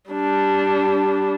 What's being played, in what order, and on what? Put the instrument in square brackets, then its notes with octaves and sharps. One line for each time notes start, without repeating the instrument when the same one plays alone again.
[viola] G3 D4